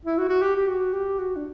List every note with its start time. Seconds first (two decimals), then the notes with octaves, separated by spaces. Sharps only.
0.05 E4
0.18 F#4
0.29 F#4
0.42 G4
0.56 G4
0.68 F#4
0.93 G4
1.19 F#4
1.36 D4